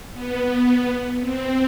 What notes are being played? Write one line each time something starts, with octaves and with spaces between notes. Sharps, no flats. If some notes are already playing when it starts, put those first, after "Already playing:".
B3
C4